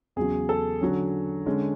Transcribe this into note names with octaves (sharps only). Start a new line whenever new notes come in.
E2 C#3 F#3 G#4
A4
D3 F#3 C#4
D3 G#3 C#4